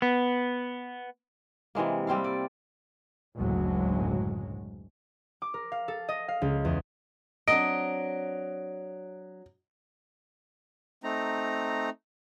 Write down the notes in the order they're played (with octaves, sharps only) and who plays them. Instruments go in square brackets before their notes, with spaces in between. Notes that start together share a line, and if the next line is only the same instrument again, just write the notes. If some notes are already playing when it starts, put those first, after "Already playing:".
[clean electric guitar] B3
[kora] C3 E3 G#3 A#3
G3 C4 E4 F5
D5
[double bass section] F#1 D2 A2 F#3 G#3
[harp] D6
A#4
F5
A4
D#5
F5
C#2
E2
[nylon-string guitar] F#3 C4 D4 [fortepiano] D#5 [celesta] D7
[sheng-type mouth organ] A3 C4 D#4 A#5